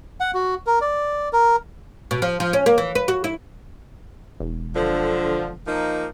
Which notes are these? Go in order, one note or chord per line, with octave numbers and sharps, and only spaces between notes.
F#5
F#4
A#4
D5
A#4
B2
F3
F3
C#4
A#3
E3
B4
F#4
E4
E1
D3 F3
F3 A#3 D#4